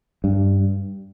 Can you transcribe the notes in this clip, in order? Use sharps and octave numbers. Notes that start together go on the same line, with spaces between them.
G2